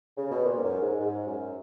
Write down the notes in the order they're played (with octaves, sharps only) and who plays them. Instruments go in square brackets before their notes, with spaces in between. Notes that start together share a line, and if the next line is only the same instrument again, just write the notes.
[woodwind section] C#3
B2
A#2
G#2
F#2
G#2
G#2
F#2